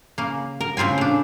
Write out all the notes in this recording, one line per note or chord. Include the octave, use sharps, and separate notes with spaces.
C#3 A#3
A#4
A2 C#3 C4 F4 G#5
C#3 D4